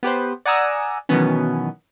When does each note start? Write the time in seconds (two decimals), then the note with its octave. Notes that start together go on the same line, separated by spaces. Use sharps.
0.03 B3 G4 B4 C5
0.45 D5 F#5 G#5 A#5 D#6 E6
1.09 B2 D#3 E3 F#3 B3 C#4